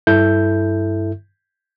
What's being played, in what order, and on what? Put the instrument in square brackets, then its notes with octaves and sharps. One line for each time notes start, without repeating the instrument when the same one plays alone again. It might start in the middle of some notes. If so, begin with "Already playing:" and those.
[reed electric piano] G2 E4 A4 E5 G6